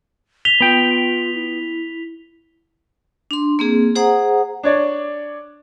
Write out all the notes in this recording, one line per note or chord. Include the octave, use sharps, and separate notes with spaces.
B6 F7 G7
B3 F4 G5
E4
D4 C6
A#3 C4 G#4
G#4 C5 F#5 A#5 D#6
D4 C#5 D5